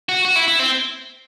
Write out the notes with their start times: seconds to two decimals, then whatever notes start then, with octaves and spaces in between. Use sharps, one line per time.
0.09 F#4
0.25 F#4
0.36 E4
0.48 E4
0.59 C4